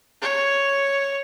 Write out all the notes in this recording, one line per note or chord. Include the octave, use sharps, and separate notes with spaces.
C#5